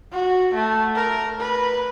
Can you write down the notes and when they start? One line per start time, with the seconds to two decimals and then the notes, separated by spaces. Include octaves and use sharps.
0.12 F#4
0.54 A3
0.95 A#4
1.40 B4